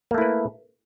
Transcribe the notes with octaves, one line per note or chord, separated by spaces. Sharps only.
A3 A#3 E4 B4